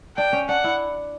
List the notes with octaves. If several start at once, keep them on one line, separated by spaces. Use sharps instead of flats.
D4 G5
C#4
D4 F#5
E4